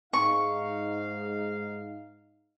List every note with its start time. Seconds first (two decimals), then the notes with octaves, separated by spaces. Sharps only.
0.13 G#2 D#4 F5 C#6